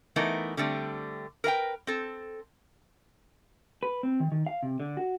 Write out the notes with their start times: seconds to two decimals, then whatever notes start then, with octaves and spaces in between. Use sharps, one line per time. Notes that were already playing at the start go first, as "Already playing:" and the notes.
0.16 E3 A3 B3 D#4 A#4
0.57 D3 G3 A3 C4
1.44 A#4 B4 F5 G5
1.87 C4 A4
3.83 B4
4.03 C4
4.20 D#3
4.32 D#3
4.46 F5
4.63 C3
4.80 D3
4.97 F#4